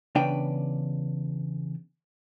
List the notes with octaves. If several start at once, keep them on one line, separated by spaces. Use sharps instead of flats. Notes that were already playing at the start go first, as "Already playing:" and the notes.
E2 C#3 D4 B4 D5 G5